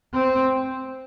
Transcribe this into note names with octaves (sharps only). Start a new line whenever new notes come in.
C4